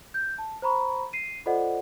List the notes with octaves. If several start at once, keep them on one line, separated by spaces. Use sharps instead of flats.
G6
A5
C5 A#5 B5 C#6
C7 D#7
F4 A4 C5 D5 D#5 F#5